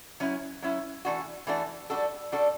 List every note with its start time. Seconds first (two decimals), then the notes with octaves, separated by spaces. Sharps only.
0.20 F#3 C#4 E4
0.62 F#3 C#4 E4
1.05 E3 A3 D4 F#4
1.47 E3 A3 D4 F#4
1.90 G3 D4 F#4 A4
2.32 G3 D4 F#4 A4